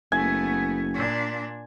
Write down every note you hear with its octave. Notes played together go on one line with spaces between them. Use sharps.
F#1 A3 B3 G#5
A#2 D4